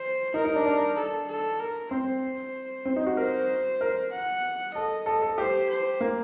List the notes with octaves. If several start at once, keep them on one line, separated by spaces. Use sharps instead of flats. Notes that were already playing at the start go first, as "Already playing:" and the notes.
Already playing: C5
D#4 A#4
D#4
D4
D4
A4
A4
A#4
C4 C5
C4
D#4
F#4
A#4 C5
A#4
F#5
A4 D#5
A4
A4
G4 C5
C5
A#3